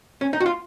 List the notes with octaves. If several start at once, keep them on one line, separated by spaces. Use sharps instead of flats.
C#4
D#4
F#4
F4